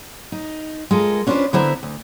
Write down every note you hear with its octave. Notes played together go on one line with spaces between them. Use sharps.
D#4
G#3 F4 A4 A#4
C#4 D4 F4 A4 B4 C5
D3 B3 E4 C5 E5 A#5
D2